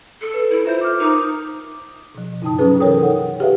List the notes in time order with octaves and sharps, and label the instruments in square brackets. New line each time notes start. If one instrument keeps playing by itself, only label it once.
[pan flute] A4
[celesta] B4
[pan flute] E4
[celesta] F4 E5 G6 [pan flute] C5
[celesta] D6 F6
[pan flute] D#4 [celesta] A#4 D6 D#6
[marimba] B2 F3
G2 C#3 D#4 G5 A5 D#6
C3 F#3 C#4 G#4 B4
E3 A4 A#4 C#5 G5 D#6
D#4 F#5
G4 G#4 B4 E5 F5